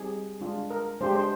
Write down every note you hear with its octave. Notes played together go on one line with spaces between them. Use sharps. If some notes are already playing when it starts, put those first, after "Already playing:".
Already playing: G3 C4 D#4 G4 G#4
G#3 D4 F4
A#4
G#3 D4 G4 C5
C5